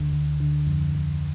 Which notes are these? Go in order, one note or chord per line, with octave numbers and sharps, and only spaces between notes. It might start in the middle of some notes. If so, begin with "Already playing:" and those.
Already playing: D2 D3
D2
D3
F2
F2